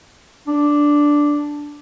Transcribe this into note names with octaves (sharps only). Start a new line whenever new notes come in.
D4